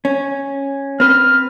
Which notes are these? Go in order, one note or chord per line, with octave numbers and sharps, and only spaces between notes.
C#4
C4 B4 F6